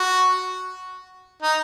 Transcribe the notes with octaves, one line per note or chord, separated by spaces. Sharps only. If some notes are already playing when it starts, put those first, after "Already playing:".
Already playing: F#4
D#4